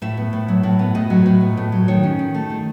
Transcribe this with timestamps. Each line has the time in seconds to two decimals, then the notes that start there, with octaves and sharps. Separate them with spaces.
0.02 A2 E5
0.17 B3
0.33 A2
0.48 F#3
0.63 A2
0.79 B3
0.95 A2 D#5
1.10 F#3
1.26 A2
1.41 B3
1.57 A2
1.72 F#3
1.88 D#3 C#5
2.03 C#4
2.19 D#3
2.34 A3
2.50 D#3